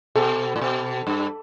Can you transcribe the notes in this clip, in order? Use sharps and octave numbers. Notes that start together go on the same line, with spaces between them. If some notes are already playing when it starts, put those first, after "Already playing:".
B2 A4
A2
B2
G2